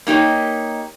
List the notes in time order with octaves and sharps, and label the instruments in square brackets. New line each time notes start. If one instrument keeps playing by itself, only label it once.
[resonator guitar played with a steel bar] A#3 D#4 G4 C#5 D#5